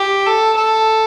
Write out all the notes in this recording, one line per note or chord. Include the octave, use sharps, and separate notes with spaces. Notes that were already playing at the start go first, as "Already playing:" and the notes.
Already playing: G4
A4
A4